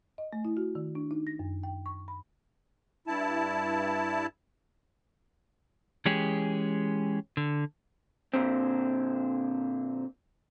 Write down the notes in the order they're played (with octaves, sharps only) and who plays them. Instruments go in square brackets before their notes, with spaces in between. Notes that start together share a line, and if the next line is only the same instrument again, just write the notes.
[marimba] D#5
A3
E4
F#4
D#3
D4
D#4
A#6
F#2
G5
C#6
B5
[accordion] G2 E4 A5
[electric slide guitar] E3 G#3 C#4 G4 G#4
D3
[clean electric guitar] A#2 D3 C4